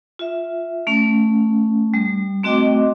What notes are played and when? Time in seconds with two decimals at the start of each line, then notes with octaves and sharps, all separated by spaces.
0.19 F4 E5
0.87 A3 C#4
1.94 G3
2.43 A3 C4 F#4 D#5 G5 D6